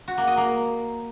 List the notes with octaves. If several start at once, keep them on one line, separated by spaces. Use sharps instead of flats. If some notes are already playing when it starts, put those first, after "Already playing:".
F#4
A#3
D#5
A#3